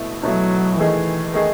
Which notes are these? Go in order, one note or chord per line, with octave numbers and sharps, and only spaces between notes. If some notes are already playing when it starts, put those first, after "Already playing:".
Already playing: B2 A3 E4
B2 F#3 A3 E4
D#3 E3 A3 D#4 G#4
D#3 A3 D#4 G#4